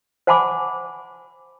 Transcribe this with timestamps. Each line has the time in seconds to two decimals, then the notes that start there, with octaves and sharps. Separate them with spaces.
0.27 C5 F#5 G#5 A5 B5 D6